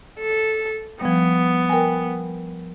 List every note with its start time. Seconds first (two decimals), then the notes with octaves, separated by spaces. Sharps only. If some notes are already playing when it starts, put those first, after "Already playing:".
0.20 A4
1.01 F3 G3 B3
1.69 A#4 G5 G#5